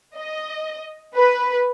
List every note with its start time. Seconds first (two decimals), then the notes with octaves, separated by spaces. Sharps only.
0.16 D#5
1.15 B4